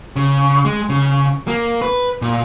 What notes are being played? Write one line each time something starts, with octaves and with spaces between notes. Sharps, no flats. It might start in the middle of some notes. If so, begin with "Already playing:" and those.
C#3
G#3
C#3
A#3
B4
A#2